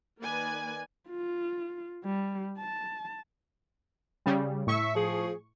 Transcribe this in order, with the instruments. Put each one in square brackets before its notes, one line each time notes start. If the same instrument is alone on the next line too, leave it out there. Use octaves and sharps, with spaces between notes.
[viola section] D#3 A#3 B4 D5 G#5
[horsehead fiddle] F4
G3
A5
[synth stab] C#3 G3
[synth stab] A2 C#6 [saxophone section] E5
[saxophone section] F3 G#4